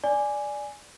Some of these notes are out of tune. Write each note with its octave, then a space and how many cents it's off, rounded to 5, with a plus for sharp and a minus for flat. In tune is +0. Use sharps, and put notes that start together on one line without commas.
D5 +0 G#5 +0